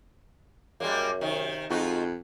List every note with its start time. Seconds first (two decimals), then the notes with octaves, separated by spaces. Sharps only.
0.80 F#2 G3 G#3 A#3
1.21 C3 D#3
1.70 F2 G#3 D#4 F4 F#4